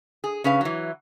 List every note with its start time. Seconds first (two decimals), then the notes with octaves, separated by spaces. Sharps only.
0.24 G#4
0.44 C#3 C#4 B4 F5
0.61 E3 F#3